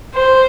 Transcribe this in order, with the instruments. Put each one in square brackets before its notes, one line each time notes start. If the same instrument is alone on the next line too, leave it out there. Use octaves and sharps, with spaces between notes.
[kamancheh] C5